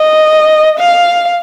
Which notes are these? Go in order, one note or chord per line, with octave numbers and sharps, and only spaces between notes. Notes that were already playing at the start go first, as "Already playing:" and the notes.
Already playing: D#5
F5